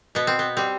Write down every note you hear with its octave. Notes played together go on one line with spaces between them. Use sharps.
B2 B3
C4
B3
G3 C4